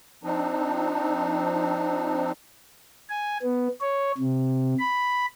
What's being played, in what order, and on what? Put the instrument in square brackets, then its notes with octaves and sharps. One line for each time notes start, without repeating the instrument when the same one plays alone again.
[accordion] F3 C4 D4 D#4
[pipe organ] G#5
B3
C#5
C3
B5